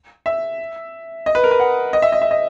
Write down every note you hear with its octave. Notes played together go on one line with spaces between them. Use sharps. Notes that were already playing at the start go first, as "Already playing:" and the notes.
E5
D#5
B4
A#4
B4
F#5
D#5
E5
D#5
E5
D#5